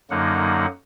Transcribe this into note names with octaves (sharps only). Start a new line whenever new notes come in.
F#2 D3 F#3 A#3 D#4 F#5